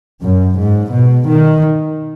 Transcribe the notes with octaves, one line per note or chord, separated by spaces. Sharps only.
F#2
G#2
B2
D#3